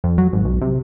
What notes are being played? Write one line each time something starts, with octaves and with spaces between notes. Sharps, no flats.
F2
F#3
G#1
B1
C3